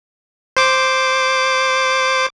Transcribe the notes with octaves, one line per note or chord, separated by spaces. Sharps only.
C5 D6